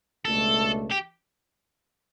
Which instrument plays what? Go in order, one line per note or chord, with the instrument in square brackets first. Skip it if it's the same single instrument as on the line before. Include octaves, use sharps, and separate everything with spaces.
[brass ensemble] C#2 B2 A3 D4 [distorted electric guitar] A4
[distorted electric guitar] G4